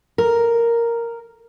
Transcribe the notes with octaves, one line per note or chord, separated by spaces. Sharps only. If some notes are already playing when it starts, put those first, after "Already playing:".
A#4